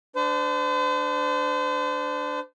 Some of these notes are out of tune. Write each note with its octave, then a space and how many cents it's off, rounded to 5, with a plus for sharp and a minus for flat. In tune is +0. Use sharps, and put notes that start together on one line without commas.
D4 +0 C5 -40